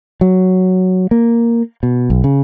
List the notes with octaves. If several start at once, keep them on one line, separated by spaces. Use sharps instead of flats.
F#3
A#3
B2
B1
C#3